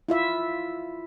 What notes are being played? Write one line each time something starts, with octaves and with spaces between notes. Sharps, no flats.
E4 F4 E5